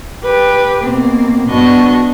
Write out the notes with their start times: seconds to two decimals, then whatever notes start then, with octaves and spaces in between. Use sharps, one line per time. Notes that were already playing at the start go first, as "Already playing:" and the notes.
0.24 G4 B4
0.82 B2 A#3 C4
1.48 G2 B3 D4 F#4 D#5 C#6